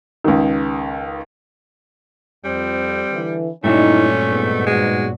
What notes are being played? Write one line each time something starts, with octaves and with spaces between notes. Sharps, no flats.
C#2 D#3
F2 G3 C4
D3 E3
G2 A#2 F#3 A3 C#4 D#4 E4
G#2 B3
G#3 F#4